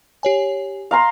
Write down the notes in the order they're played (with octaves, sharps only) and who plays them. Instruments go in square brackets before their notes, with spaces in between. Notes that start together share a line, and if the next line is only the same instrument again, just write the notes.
[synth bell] G4 C#5 G#5
[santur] F5 A#5 C6